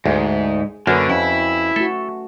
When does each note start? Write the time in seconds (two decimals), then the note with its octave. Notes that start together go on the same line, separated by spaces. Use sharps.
0.06 D2 G#2 G#4
0.87 F#2 D3 A#3 D4 F#4 B4
1.09 F2 C#4 E4
1.76 A3 F#4 A4